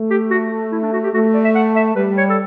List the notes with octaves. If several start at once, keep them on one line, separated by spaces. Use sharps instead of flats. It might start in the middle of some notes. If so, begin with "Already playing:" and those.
Already playing: A3
G4
F#4
E4
D4
F#4
G4
A3 F#4
D5
E5
F#5
E5
G3 B4
C#5
A4